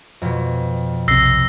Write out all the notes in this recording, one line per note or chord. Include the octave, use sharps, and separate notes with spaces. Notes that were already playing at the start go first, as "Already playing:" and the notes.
F2 B2
B1 C3 E6 A#6 C7